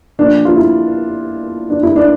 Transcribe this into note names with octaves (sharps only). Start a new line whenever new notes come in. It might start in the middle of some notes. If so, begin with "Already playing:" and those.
A#2 F3 D4
F4
E4
D4
E4
D4